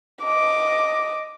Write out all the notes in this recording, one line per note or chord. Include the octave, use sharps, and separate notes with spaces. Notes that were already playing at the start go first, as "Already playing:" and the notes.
D#5 D6